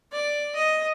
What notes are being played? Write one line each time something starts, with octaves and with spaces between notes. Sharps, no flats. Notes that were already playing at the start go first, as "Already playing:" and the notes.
D5
D#5